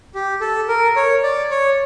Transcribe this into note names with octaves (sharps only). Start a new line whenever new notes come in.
G4
A4
A#4
C#5
D5
C#5